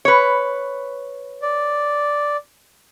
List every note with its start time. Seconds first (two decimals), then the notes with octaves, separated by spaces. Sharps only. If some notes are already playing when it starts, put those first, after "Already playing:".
0.05 B4 C#5
1.42 D5